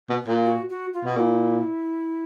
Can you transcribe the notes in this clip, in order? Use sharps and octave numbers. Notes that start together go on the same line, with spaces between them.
B2
A#2
F#4
F#4
F4
B2
A#2 E4